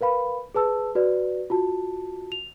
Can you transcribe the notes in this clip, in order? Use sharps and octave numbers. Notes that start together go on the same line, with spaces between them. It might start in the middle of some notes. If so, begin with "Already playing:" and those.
A#4 B4 F5 B5
G#4 B4 A5 E6
F#4 B4 D5
F4 F#4 A5
F7